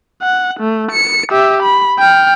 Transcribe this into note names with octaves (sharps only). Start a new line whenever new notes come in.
F#5
A3
C#7
G4 E5
B5
G5 F6